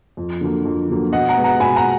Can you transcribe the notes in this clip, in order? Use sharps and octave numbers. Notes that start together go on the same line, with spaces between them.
F2
D3 F#3 A#3
F2
D3 F#3 A#3
B2 D#5 F#5
F#5 A#5
G#3 B3
F#5 A#5
B2 G#5 B5
F#5 A#5